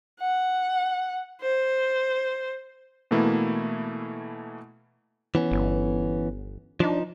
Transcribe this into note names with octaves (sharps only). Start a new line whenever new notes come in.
F#5
C5
B2 E3 A3 A#3 E4
E3 B3 C#4
G1
F3 D4 D#4